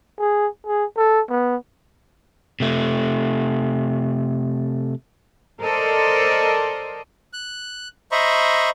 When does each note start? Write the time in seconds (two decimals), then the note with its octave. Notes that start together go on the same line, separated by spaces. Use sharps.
0.19 G#4
0.67 G#4
0.97 A4
1.30 B3
2.60 C3 A3
5.62 A4 A#4 C5 D5 D#5
7.33 F#6
8.12 C5 D#5 E5 A#5 B5 C#6